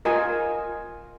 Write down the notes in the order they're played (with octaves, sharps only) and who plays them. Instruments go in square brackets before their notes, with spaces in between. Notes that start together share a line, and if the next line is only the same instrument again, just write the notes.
[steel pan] F4 A#4 D#5 G#5